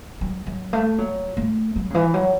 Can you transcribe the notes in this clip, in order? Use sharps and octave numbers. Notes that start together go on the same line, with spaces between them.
F#3
F#3
A3
F#3
A3
F#3
C#3
E3
F#3